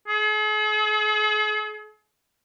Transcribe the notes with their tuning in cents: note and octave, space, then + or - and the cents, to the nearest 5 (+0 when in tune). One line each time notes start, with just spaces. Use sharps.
G#4 +45